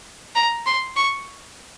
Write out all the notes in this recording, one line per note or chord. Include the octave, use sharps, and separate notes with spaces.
A#5
C6
C#6